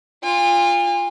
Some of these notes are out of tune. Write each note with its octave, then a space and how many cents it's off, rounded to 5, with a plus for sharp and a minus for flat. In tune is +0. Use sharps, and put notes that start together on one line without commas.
F4 +0 G#5 -40